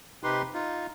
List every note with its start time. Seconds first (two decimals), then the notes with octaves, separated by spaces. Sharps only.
0.24 C3 D#4 G4 B4 C6
0.54 D#4 F4